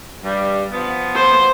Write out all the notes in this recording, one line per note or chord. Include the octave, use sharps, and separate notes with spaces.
G2 G3
F3 B3
C5